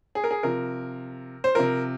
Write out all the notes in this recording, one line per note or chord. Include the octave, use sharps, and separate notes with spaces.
G#4
A#4
G#4
C3 F3 A#4
C5
C3 F3 A#4